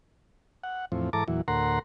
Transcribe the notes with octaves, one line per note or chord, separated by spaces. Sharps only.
F#5
E2 A2 F3 C4
G#2 E3 A4 A5 A#5 D6
E2 A#2 E3 F#3
D2 A2 A#4 F#5 A#5 C6